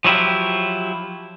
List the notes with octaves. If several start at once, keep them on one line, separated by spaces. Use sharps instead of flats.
F3 F#3 E4 F4 G4